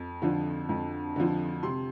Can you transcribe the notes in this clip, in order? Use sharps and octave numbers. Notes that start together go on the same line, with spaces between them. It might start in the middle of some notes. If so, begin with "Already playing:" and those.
Already playing: F2
D3 F3
F2
D3 F3
C3 C6